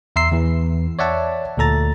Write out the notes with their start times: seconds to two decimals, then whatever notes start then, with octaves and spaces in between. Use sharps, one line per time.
0.16 E2 E5 A#5 C6 E6 C7
0.32 E2 E3
0.99 C#5 D5 E5 F#5 A5
1.57 D2 A#2 A4 A#5 A6